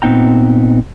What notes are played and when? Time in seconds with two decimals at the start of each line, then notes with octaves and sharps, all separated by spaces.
0.02 A#2 B3 C4 D#4 G5 A#5